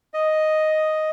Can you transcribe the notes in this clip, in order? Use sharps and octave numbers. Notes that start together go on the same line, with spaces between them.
D#5